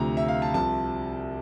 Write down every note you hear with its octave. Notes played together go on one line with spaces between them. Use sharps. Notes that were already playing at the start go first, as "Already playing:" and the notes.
Already playing: D2 C3 F3 A#5
E5
F5
A5
C2 C3 F3 A5